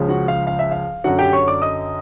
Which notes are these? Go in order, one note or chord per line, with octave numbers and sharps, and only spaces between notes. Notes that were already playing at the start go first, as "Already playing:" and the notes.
Already playing: C#2 C#3 F3
F#4 F#5
F5
F5
E5
F5
F#2 D3 F#3 F#4 F#5
G4 G5
C#5 C#6
D5 D6
D#5 D#6